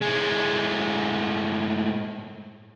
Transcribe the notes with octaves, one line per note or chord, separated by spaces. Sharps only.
A2 G#3